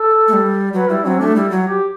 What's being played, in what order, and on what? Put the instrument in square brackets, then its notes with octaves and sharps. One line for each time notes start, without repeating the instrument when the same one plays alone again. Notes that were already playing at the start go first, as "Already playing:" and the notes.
Already playing: [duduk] A4
[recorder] A3
G3
[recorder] F#3 [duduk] B4
[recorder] G3 [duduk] E4
[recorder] F#3 [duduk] C4
[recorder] A3 [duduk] D4
[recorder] G3 [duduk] E4
[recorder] F#3
[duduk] G4